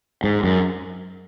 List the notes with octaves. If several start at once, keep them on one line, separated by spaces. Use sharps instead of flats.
G#2
F#2